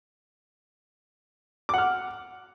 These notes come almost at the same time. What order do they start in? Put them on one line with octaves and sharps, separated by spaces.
D6 F#5 F6